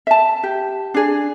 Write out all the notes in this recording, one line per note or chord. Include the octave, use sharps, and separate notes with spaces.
E5 A5
G4
D4 G#4